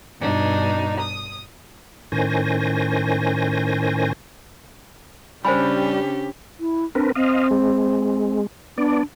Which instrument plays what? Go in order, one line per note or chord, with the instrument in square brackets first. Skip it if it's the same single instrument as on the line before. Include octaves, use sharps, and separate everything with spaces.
[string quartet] G2 B2 D4 D#4
D#6
[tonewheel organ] A2 D#3 C#4 C5 G#5 A#6
[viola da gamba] C#3 C#4 D4 [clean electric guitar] G3 [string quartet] G4 [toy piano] C5 G#5 B5
[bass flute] E4
[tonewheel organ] C4 A#4 B4 [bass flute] D4
[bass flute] C4 [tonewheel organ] D#5 F5
[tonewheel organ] G#3
[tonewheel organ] B3 D5 [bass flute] D4